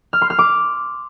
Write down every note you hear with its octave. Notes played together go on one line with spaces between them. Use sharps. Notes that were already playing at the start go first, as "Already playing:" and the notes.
F6
C6
F6
D6